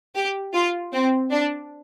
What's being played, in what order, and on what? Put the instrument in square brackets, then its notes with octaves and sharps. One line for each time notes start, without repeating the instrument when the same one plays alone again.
[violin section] G4
F4
C4
D4